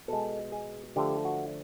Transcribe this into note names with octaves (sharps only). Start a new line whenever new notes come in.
B2 G#3 A4
G#4
D3 F3 A3 G4
F#4